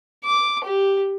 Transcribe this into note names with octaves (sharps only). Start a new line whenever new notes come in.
D6
G4